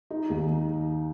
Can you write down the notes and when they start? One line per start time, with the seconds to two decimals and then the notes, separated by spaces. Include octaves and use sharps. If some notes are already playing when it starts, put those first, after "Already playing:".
0.10 D#4
0.30 D#2